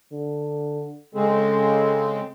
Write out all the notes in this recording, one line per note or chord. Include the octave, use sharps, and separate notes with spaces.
D3
C#3 G#3 C4 A4